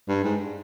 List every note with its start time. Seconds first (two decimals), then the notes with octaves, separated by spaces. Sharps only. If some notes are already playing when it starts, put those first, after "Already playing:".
0.09 G2
0.25 G#2